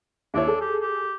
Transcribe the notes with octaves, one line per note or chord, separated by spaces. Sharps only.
D#2 D4 E4 C#5
G#4 A4
G4
G4